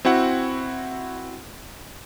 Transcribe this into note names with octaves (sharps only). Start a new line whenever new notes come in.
C4 E4 F#4 F#5